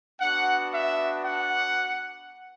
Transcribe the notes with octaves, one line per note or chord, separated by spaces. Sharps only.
B3 D4 F#4 F#5
E5
F#5